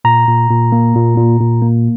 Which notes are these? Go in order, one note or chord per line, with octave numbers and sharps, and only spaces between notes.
A#2 A#5
A#2
A#2
A#3
A#2
A#2
A#2
A#3